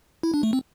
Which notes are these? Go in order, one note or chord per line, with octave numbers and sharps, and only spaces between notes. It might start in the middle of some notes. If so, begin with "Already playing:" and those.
E4
D4
A3
C4